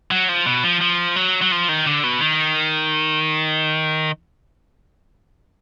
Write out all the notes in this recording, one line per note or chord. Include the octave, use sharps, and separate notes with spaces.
F#3
F3
B2
F3
F3
F#3
F#3
F3
D#3
D3
B2
D#3